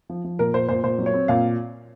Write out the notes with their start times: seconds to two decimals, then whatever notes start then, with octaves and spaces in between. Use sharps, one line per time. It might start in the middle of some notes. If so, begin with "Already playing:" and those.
0.10 F3
0.24 F3
0.39 A#2 A#4
0.54 A#2 C5
0.68 A#2 C5
0.84 A#2 C5
0.99 F#3
1.06 C#5
1.14 C4
1.28 A#2 F5